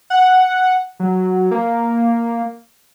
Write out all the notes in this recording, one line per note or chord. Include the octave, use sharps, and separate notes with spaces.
F#5
F#3
A#3